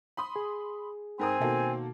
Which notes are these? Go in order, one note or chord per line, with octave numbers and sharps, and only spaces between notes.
B5 C6 D#6
G#4
G#2 C4 A#4 G#5 D#6
B2 D#3 A#3 F#4 A4